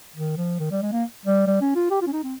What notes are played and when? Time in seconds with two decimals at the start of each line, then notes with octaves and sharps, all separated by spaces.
0.16 D#3
0.37 F3
0.59 D#3
0.71 G3
0.82 G#3
0.92 A#3
1.25 G3
1.47 G3
1.61 C#4
1.75 F4
1.91 G4
2.02 F4
2.07 C#4
2.13 D#4
2.24 C4